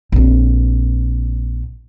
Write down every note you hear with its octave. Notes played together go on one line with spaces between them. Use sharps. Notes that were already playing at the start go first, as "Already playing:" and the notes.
A#1 C4